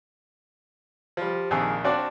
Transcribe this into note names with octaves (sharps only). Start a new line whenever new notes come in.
F3 G3
A#1 F2 D#3 G#4 F5 E6
C4 D4 F#4 D5 F5 A5